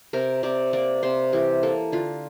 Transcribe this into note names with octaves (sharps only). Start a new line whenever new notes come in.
C3 A#4
C3 D5
A#3 D5
C3 C5
E3 G4
A#3 A4
D3 F4